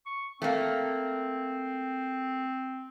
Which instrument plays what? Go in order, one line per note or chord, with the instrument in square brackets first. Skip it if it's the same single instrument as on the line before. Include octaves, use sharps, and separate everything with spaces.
[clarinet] C#6
[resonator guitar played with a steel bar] A3 A#3 [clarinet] C4